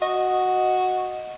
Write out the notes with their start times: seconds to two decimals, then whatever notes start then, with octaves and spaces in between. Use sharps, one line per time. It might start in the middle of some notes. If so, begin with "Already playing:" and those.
0.02 F#4 D#5